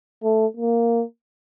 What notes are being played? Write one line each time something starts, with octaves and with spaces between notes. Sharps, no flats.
A3
A#3